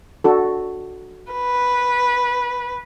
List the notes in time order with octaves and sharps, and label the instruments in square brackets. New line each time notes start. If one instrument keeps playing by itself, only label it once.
[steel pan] D4 F#4 A4
[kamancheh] B4